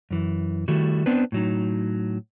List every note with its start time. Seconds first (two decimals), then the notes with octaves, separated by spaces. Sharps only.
0.11 F#2 E3
0.68 D#3 G3 A3 E4 F#4
1.06 B3 C4 D4 B4
1.32 A2 F#3 D#4